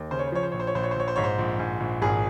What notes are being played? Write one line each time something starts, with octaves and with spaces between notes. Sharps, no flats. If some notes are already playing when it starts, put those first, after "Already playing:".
Already playing: D#2
C#3 C5
C#5
C5
F3 C#5
C5
A#1 C#5
C5
C#5
A#1 C5
C#5
C5
A#1 C#5
C5
G#2 C#5
C5
A#1
G#2
A#1
G#1 G#4